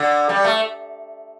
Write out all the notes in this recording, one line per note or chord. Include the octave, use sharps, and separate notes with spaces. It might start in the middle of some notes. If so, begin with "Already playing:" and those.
Already playing: D3
G3
A3